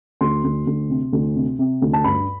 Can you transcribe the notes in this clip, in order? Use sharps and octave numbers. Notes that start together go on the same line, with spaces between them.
D2 C6
D2
D2
C3
D2
C3
C3
D2
A5
G2 B5